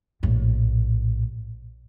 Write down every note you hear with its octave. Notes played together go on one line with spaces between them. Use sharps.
A#1 A2